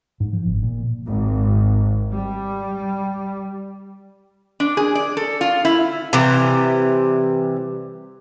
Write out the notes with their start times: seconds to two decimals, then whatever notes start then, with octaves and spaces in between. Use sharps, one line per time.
0.20 G#2
0.33 F3
0.46 G1
0.63 A#2
1.06 G#1
2.13 G3
4.60 D4
4.77 G#4
4.95 D5
5.17 A4
5.41 F4
5.65 E4
6.13 C3 E3 G3